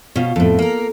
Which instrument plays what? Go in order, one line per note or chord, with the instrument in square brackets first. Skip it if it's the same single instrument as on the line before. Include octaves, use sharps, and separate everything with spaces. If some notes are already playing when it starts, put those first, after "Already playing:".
[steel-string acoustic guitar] B2 [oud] C#4 F4
[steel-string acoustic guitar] F2 A2 [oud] A4
[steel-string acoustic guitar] A#3 A#4